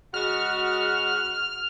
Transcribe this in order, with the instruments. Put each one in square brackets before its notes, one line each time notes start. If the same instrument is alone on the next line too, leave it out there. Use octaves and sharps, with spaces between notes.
[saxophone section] C#3 G#3 F#4 [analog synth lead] F6